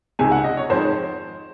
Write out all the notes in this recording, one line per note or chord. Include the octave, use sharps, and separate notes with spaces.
C#2 C3 D#3 G#3 G#5
F#5
D#5
C#5
F2 D#3 G#3 C5